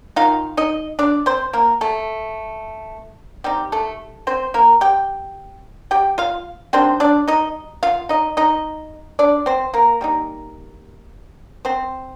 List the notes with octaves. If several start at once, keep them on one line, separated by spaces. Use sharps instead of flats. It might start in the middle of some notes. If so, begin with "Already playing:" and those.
A#3 D#4 F4 F5
D#3
D#4 D#5
D4 D5
C4 C5
A#3 A#4
A3 A4
G3 C4 D#4 G4
A3 A4
C4 C5
A#3 A#4
G4 G5
G4 G5
F4 F5
D#3 G3 C4 D4 C5
D4 D5
D#4 D#5
F4 F5
D#4 D#5
D#4 D#5
D4 D5
C4 C5
A#3 A#4
G3 C4 D#4
C4 C5